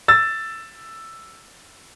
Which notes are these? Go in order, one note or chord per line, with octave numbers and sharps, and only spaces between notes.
E6 A6